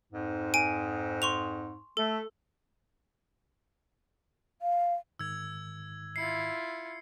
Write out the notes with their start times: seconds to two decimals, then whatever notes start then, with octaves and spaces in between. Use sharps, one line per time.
0.11 F2 G#2
0.54 G#5 D7
1.22 C6 C#6 F7
1.97 A3 A4
4.62 F5
5.19 G#2 D#3 E6 G#6
6.16 E4 F4 C7 C#7